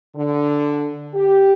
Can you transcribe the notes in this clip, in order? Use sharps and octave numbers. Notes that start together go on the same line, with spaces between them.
D3
G4